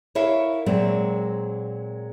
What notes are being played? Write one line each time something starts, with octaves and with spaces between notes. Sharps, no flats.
E4 A#4 C#5 E5 F5
A#2 F#3 G#3 C4